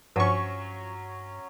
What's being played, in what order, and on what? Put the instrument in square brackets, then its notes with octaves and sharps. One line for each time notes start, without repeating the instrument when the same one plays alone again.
[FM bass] G2 [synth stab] F3 C#6 [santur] F#3 C#4